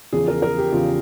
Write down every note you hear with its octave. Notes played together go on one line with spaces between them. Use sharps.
E2 C#3 F3 G#4
A#4
A#4
G4
E2 C#3 F3 F4